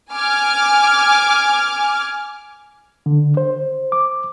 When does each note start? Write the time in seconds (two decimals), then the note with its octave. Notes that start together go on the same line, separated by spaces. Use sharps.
0.13 G#5 D6 F6
3.06 D3
3.37 C5
3.92 D6